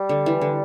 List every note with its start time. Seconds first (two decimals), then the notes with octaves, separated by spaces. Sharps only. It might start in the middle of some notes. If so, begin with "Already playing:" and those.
Already playing: G3
0.09 D3
0.26 E3
0.41 D3